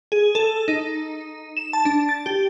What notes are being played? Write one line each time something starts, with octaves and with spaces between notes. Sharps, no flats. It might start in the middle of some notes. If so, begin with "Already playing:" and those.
G#4
A4
D#4
E7
A5
D4
A6
G4